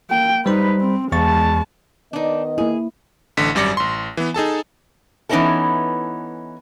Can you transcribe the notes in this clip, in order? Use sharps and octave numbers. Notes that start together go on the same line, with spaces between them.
A#3 G5
G3 D#4 B4 C5 B5
C4
E2 G#3 A5 C#6 A6
D#3 B3 D4 D#4 D#5
A#3 E4 G#4
A1 D3 B6
G#1 F#2 G3 D5 A#6 C#7
A1 C6
E3 B3
D#4 G#4 A4 A5
E3 B3 C#4 D#4 E4 A4